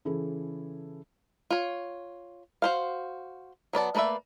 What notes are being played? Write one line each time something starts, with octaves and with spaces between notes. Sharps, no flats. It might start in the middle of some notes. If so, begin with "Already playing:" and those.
C#3 E3 E4 G#4 A4
F4 C#5
F#4 C5 F5
F#3 B3 D5 A5
A3 A#3 B4 D5 E5